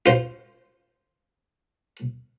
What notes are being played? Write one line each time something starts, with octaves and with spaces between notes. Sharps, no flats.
F4 C5